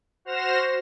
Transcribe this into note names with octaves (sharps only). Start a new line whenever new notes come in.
F#4 C5 F6 A#6 E7